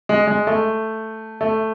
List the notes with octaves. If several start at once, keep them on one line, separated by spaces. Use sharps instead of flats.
G#3
G#3
A3
A3